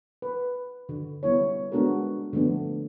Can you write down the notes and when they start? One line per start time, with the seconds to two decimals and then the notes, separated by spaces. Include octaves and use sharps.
0.22 B4
0.89 D3
1.23 G3 B3 E4 C#5
1.72 G#3 B3 D4 F#4 A4 A#4
2.33 D3 F3 A3 B3 D4